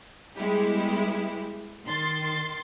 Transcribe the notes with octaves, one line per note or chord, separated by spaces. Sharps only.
G3 G#3 B3 E4 G4
D#3 C6 A6